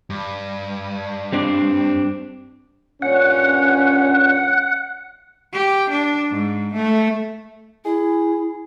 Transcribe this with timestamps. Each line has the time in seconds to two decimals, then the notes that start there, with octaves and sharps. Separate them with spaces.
0.10 G2
1.32 G3 C4 D4
3.02 G2 A#2 C#4 F#5
5.53 G4
5.90 D4
6.31 G#2
6.74 A3
7.85 E4 G#4